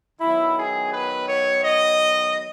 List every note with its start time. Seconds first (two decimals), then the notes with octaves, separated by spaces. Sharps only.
0.20 D#3 F#3 B3 E4
0.55 G#4
0.91 B4
1.27 C#5
1.62 D#5